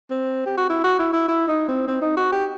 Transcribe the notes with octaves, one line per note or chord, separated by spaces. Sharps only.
C4
G4
F#4
E4
F#4
E4
E4
E4
D#4
C4
C4
D#4
F#4
G4